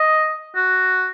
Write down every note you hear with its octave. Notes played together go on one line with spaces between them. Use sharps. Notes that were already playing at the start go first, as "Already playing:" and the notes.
Already playing: D#5
F#4